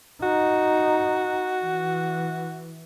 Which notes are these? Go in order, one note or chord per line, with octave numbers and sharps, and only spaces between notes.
D#4 F#4
E3